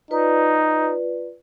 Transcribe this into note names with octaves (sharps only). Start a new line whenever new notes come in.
D#4 F4 B4 D5